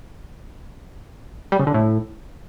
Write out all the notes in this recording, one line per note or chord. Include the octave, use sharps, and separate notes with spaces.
G3
C#3
D3
A2